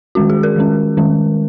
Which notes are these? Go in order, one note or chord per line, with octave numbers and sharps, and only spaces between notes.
D#3 G#3 C#4 F#4
G#4
A#4
D#3 G#3 C#4
D#3 G#3 C#4